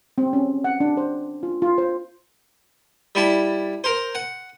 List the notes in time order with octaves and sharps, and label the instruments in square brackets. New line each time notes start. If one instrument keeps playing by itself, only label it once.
[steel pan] C4
C#4
F#5
D4
C5
F4
F4
C5
[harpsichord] G3 E4 A5
A#4 C5
F#5